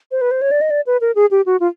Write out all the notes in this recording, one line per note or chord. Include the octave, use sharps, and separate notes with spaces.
C5
B4
C5
C#5
D5
D#5
D5
B4
A#4
G#4
G4
F#4
F4